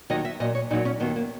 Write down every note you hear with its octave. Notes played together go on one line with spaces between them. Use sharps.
D#2 D#3 F#3 D#5
E5
A#2 F#3 D#5
C#5
A#2 F#3 D#4
C#4
D#2 D#3 F#3 B3
A#3